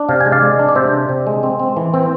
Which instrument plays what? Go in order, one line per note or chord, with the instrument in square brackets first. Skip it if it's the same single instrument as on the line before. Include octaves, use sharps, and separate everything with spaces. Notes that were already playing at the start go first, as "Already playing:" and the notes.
Already playing: [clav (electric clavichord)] D4
C3 F5
G#5
G#3
D5 F5
G#3
D4
D5
C3 C5 E5
D4
C3
G#3
C4
C4
E3
C4